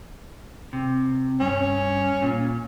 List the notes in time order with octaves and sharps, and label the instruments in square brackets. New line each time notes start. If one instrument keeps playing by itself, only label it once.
[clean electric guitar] C3
[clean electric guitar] G2 [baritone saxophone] C#4
[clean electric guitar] A#2